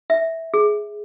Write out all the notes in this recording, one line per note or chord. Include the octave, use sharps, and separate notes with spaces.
E5
G#4